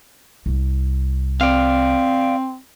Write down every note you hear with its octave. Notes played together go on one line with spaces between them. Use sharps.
C2
C4 D5 F5